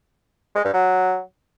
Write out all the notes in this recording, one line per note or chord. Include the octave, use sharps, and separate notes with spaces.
G#3
G2
F#3